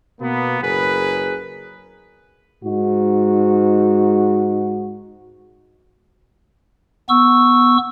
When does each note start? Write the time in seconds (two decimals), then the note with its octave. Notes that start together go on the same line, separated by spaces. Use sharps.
0.21 B2 A#3 B3
0.61 F#1 G#4 A#4 B4
2.64 G#2 D#4 F#4
7.09 B3 C#6 E6